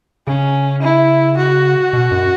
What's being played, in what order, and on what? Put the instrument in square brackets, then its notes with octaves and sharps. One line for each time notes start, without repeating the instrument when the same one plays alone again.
[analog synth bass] C#3 [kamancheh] C#4
[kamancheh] E4
F#4
[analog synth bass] B2
F#2